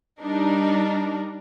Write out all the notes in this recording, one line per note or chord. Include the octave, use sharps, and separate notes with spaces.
G3 D4 D#4 A#4